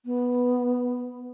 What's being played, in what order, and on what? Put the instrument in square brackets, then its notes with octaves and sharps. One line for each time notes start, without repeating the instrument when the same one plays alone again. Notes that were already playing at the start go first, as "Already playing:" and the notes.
[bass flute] B3